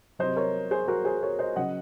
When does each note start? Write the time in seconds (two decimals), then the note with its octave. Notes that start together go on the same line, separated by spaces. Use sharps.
0.19 C3 F#3 C5 D#5
0.37 A#4 C#5
0.71 G#4 C5
0.88 F#4 A#4
1.05 G#4 C5
1.22 A#4 C#5
1.39 C5 D#5
1.56 C#3 F#3 D#5 F#5